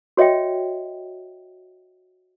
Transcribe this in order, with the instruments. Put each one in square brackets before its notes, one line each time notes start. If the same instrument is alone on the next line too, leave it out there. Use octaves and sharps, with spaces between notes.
[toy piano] F#4 C#5 D#5 E5 G5